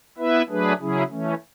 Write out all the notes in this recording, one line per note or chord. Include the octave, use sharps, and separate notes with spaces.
B3 E4 B4 E5
F#3 A3 D4 G#4 B4
C#3 F#3 C#4 E4 G#4
E3 A3 C#4